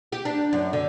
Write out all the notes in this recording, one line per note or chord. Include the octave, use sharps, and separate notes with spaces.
G4
D4
F#2
D3